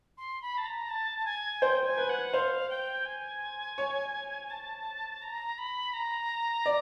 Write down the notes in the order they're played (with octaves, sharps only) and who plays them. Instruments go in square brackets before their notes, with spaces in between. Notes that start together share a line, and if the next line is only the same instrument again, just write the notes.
[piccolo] C6
B5
A5
A#5
A5
A5
G#5
[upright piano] C5 [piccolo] G5
[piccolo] G#5
[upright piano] B4
[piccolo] F#5
[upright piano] C5 [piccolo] F5
[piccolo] G5
G#5
[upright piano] C#5
[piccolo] A5
A#5
B5
A#5
[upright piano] D5